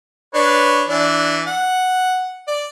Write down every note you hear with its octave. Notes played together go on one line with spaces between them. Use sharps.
D4 B4 C#5
E3 D4
F#5
D5